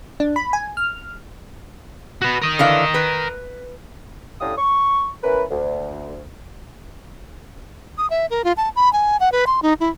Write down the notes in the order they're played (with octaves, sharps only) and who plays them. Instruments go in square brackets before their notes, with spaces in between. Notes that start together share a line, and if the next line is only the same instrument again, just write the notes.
[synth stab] D4
B5
G#5
F6
[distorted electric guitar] F#4 B4
A#4 D#5
[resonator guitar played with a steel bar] D3 E3 F5
B4
[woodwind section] A2 D3 C#4 G4 F5 D#6
C#6
E3 C#4 A#4 B4
D2
[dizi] D#6
E5
A#4
F4
A5
B5
G#5
F#5
B4
C6
D#4
E4